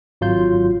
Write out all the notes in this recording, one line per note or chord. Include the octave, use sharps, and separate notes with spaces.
G#1 F#3 F4 C6 G6